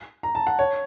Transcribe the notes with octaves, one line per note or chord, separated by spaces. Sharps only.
A#5
A5
F#5
C#5